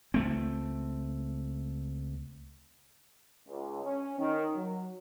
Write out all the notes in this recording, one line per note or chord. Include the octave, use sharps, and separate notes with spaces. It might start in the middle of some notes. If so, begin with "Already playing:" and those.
C#2 A3 C4
C#2
C#4
D#3
F#3